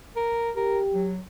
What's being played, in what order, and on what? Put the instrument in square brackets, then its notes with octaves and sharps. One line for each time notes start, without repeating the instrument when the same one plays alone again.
[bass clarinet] A#4
[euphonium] G4 [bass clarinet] A#4
[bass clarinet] F#3